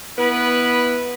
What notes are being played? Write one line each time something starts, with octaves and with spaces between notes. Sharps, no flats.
B3 E4 B4